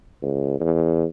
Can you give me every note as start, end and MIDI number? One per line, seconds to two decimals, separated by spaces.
0.22 0.60 37
0.60 1.05 40